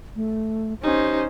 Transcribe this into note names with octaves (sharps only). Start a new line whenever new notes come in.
A3
C#4 D#4 G4 C5